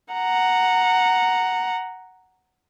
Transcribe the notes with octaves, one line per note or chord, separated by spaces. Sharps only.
F#5 A#5